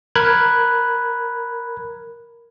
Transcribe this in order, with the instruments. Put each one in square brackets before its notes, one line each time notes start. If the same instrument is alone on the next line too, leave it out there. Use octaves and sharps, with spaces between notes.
[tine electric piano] A#4 B5 F#6 G#6